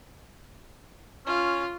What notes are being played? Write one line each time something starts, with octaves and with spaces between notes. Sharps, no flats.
C#4 F4